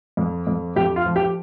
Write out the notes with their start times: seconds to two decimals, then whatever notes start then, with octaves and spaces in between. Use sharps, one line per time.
0.17 F2
0.47 F2
0.76 F2 G4
0.96 F4
1.06 F3
1.16 G4